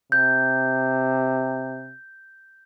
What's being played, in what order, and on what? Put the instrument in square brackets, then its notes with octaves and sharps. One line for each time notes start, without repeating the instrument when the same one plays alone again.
[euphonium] C3 [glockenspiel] G6